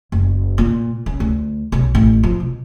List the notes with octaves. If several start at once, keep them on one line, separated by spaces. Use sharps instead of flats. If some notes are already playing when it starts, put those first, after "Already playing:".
F#1
A#2
C#4
D2
B1
A1
F3
B2